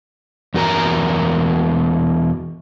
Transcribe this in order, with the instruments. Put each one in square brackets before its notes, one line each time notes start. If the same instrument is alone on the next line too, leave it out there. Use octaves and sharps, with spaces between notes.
[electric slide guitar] E2 F#4 A#4 A#5